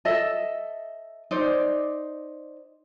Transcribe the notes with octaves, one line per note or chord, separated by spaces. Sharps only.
A4 D#5 E5
D#4 C5 D5